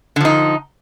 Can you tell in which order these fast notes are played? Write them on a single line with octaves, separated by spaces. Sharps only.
D3 F3 D#4